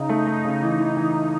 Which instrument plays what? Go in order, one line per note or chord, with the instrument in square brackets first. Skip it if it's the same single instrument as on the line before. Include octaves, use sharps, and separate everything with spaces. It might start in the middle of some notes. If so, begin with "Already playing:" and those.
Already playing: [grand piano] C#3 [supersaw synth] D#4
[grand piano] A3
A3
C#3
E3
E3
E3